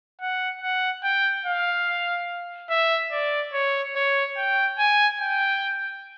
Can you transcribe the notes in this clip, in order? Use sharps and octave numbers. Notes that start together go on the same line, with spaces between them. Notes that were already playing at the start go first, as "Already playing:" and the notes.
F#5
F#5
G5
F5
E5
D5
C#5
C#5
G5
G#5
G5